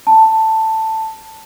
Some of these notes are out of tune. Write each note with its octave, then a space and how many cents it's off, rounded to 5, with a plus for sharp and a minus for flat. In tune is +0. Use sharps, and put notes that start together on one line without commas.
A5 +10